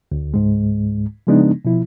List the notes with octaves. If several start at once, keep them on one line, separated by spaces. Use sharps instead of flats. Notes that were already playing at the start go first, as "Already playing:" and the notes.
D2
C#2 G#2 G#3
C#3 F3 G#3 B3 D4 D#4
B2 F3 E4